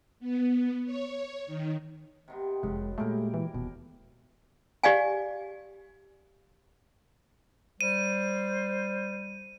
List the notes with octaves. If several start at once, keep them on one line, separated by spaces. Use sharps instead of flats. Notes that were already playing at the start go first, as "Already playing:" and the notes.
B3
C#5
D#3
C3 D#3 B3
F1 F#2 G#3
A#2 G#3 A3 E4 G4 A#4
E3
D#1 B2
G4 D5 F5 G#5
G3 C5 D#7